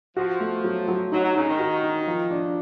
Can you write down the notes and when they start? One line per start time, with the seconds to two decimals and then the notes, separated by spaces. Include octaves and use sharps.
0.17 F3 F#4
0.40 A3
0.64 F#3
0.88 F#3
1.12 F#3 D#4
1.24 F#3
1.35 C#3 D#4
1.48 D#3
1.59 F#4
1.83 D#4
2.07 F3
2.31 D4